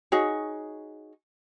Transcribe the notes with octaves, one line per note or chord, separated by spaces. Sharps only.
D#4 F#4 G#4 C#5